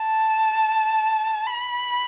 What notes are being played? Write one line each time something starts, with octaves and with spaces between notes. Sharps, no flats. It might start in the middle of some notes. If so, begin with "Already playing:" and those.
Already playing: A5
B5